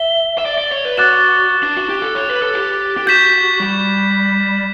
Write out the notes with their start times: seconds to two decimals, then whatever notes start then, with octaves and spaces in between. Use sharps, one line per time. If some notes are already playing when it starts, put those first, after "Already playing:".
Already playing: E5 G7
0.38 E5
0.46 D5
0.58 D5
0.72 C#5
0.85 B4
0.97 F#4 D6 F#6 A6 E7
1.63 D4
1.77 F#4
1.89 G4
2.02 A4
2.15 C#5
2.29 B4
2.42 A4
2.54 G4
2.97 G4
3.07 F#4 G6 B6 E7
3.60 G3